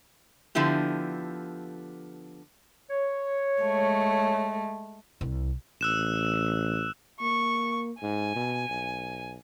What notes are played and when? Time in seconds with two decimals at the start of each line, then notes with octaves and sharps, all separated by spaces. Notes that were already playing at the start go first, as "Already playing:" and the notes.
0.55 D3 F3 B3 E4 G4
2.90 C#5
3.62 G#3 A3
5.21 C2
5.81 A1 E6 F#6 E7
7.21 A#3 C#6
8.02 G#2 G#5
8.35 B2
8.70 B1